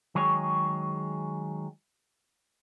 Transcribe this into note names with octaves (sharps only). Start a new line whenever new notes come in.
D#3 F#3 G#3 G#4 C#5